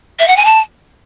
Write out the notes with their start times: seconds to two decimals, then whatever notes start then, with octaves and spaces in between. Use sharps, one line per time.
0.19 E5
0.28 F#5
0.37 G#5
0.45 A5